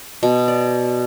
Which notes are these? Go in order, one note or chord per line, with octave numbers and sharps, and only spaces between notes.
B2
D5